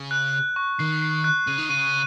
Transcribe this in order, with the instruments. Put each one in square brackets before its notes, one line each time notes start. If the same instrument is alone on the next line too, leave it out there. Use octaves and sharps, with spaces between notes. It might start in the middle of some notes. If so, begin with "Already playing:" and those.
Already playing: [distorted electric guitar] C#3
[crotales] F#6
F#6
C#6
[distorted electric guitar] D#3 [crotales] C7
[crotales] C7
F#6
[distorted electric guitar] C#3 [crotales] D#7
[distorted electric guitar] D#3
[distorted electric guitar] C#3 [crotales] D#7